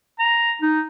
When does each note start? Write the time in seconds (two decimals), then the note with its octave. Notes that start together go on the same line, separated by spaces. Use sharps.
0.19 A#5
0.62 D#4